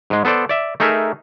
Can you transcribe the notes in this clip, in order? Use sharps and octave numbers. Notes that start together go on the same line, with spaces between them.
G#2 G#3
B3 A4 C5 D5
D5 E5
A3 D#4 G#4 A#4 E5